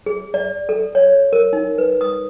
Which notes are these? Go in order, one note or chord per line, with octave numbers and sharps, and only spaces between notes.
G#4
D5
A4
C#5
A#4
D#4
B4
D#6